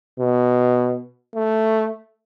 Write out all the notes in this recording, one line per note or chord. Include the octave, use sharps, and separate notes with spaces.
B2
A3